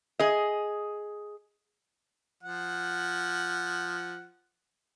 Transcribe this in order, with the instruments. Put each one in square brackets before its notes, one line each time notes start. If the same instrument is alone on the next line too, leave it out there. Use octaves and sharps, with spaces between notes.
[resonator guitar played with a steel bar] G#4 D#5
[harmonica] F3 F#5